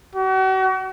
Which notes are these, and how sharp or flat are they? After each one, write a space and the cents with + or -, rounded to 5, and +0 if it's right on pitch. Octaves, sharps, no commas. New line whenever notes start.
F#4 +40